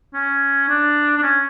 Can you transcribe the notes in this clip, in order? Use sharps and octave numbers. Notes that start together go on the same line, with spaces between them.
C#4
D4
D4
C#4